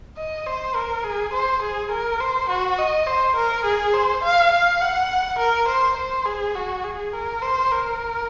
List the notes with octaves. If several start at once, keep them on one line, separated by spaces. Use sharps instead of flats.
D#5
C5
A#4
G#4
C5
G#4
A#4
C5
F#4
D#5
C5
A#4
G#4
C5
F5
F5
F#5
A#4
C5
C5
G#4
F#4
G#4
A#4
C5
A#4